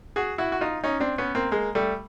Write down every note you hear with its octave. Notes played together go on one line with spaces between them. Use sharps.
F#4 G#4
E4 F#4
F#4
D#4 F4
C#4 D#4
C4 D4
B3 C#4
A#3 C4
G#3 A#3
G3 A3